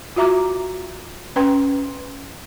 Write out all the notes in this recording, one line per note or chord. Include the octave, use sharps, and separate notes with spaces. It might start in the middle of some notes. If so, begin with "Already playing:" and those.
F4 F#4 E5 A#5 D6
C#4 B4 G5 C6